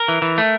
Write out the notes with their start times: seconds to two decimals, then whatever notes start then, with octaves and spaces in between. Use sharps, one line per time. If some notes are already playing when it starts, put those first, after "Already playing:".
Already playing: A#4
0.08 E3
0.22 E3
0.38 A3